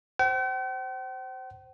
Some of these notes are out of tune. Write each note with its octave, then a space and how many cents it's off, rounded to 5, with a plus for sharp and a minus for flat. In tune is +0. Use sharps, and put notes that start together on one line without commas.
C5 +0 G5 -45